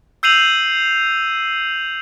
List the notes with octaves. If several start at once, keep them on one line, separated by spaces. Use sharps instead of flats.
E6 G6 C7 D#7 F7 F#7